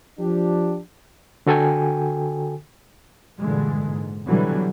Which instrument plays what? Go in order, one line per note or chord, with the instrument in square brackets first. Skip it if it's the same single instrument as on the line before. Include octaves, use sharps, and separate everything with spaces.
[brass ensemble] F3 D4 G4
[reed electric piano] D3 F#4 A4 G5 G#5
[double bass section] G2 A#2 D3 E3 G#3
G#2
B2 D3 E3 F#3 G3